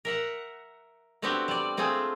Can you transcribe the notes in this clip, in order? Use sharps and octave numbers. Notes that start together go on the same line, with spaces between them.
A#4 E5 F#5
A3 B3 C4 D4 F#4 G4
G3 D5
A3 C4 F4 G#4 A4